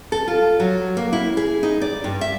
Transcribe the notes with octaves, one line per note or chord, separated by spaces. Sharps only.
A4
F4
F#3
A#3
E4
G#4
D#4
D5
G2
E5